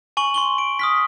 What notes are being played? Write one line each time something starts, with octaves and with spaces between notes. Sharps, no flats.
G#5 C#6 F#7
C6 C#6 G7
D7
D#6 F6 B6